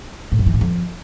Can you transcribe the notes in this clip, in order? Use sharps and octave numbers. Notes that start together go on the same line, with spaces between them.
A2
F#2
E3
A2
F2